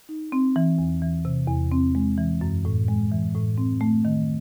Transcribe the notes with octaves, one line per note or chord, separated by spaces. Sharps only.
D#4
C4
E3
E2
E3
C3
E2
C4
G#3
E3
F#2
A2
G#3
E3
A2
C4
A3
D#3